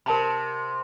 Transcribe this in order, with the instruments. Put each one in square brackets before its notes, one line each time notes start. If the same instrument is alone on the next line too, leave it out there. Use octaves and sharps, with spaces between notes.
[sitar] C3 [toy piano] A#4 A5 B5